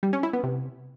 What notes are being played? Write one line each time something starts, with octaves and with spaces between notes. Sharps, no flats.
G3
C#4
E4
B3
C3